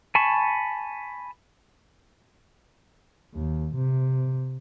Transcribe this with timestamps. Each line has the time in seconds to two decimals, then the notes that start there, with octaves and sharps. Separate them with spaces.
0.15 G#5 A5 B5 C#6
3.35 D#2
3.75 C3